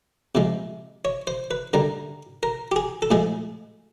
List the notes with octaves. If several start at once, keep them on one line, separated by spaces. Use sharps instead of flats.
C3 F3 G#3
C#5
C5
B4
D3 G3 A#4
A#4
G4
G#4
A4
A2 F3 G#3 G#4